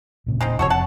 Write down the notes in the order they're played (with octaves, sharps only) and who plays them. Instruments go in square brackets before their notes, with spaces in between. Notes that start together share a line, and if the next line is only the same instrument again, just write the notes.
[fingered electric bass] E1 A#2 C#3
[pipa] G#3 C4 D#4
[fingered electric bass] F1 F2 [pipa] F#4 A4 C#5
[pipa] F#5 A5